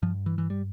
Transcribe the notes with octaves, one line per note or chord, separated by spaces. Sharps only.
G2 F3
E3
E3
G3